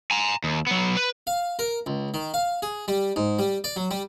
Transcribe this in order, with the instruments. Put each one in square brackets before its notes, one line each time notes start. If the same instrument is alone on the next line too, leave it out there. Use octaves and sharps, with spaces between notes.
[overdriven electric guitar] G#5 A#5
D#2
F#3 B3
B4
[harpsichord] F5
A#4
C#2
D#3
F5
G#4
G3
G#2
G3
D5
F#3
G3